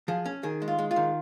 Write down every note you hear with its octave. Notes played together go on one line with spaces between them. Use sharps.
F3 G#4
C#4
D#3 G#4
G#3
F4
G#3
F4
D#3